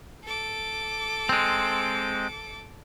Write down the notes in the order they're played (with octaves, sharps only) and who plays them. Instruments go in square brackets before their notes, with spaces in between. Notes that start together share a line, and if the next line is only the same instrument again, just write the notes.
[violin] A4 D6
[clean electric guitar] G#3 C4